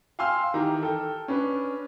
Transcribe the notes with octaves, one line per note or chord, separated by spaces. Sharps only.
F5 G5 G#5 C6 E6 F6
D#3 E3 G4 A#5
A4 G5
C#4 D4 B4